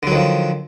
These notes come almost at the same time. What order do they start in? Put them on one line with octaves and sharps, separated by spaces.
D3 F#3 D#3 F3